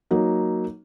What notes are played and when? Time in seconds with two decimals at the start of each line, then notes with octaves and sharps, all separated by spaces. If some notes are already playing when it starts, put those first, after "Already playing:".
0.11 F#3 A#3 D#4